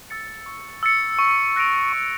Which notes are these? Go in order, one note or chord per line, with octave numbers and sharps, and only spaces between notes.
E6 A6 C#7
C#6
E6 A6 C#7
C#6
F#6 A#6 D7 F7
C#6